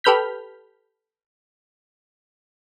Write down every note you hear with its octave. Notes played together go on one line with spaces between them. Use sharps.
G4 A4 B4 F6 G6 B6